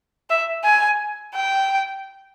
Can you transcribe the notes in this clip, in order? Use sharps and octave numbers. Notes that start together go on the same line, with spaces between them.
E5
G#5
G5